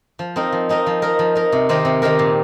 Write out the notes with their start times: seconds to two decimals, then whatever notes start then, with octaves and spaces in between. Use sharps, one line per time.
0.19 F3
0.36 C4 D#4 A#4
0.52 F3
0.69 C4 D#4 A#4
0.86 F3
1.02 D#4 A#4
1.19 F3
1.35 D#4 A#4
1.52 C3
1.69 D#3 C4 G4 A#4
1.85 C3
2.02 D#3 C4 G4 A#4
2.19 A#2